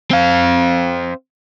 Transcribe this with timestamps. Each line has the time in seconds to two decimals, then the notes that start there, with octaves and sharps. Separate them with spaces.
0.11 C4 F5